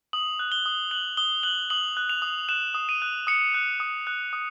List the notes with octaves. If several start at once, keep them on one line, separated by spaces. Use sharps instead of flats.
D#6 F#7
F#6
G7
D#6
F#6 F#7
D#6 G7
F#6 F#7
D#6 F#7
F#6
F7
D#6
F#6 E7
D#6
D#7
F#6
D#6 C#7
F#6
D#6
F#6
D#6